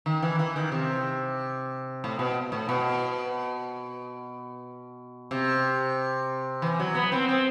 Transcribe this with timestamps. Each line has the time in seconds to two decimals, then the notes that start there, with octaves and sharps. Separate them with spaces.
0.06 D#3
0.23 E3
0.39 E3
0.56 D#3
0.72 C3
2.04 A2
2.19 B2
2.52 A2
2.69 B2
5.31 C3
6.62 E3
6.80 F#3
6.95 B3
7.12 C4
7.29 C4